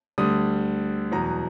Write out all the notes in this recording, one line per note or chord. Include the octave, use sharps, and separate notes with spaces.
D2 D3 G3 D#6
E2 B2 F#3 A#5